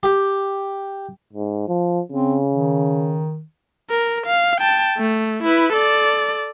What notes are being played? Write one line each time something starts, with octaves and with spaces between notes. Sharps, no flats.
G4
G#2
F3
C#3 C4
D#3
A#4
F5
G5 A5
A3
E4 B4
A4 D5